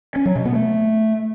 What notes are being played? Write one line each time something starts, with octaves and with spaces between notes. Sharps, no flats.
C#4
F#3
B2
B3
A3